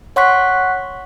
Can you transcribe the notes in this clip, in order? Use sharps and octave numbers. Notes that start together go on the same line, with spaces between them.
C#5 F#5 C6 C#6 F#6 B6